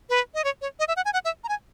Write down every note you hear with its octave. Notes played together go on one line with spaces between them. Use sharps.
B4
D#5
C#5
C#5
D#5
E5
F#5
G#5
F#5
E5
A#5
G#5